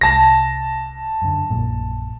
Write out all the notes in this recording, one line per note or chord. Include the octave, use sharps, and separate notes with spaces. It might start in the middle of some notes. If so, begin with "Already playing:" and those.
C2 G#3 A5 A#6
F#2 D3
A#1 F#2 A#2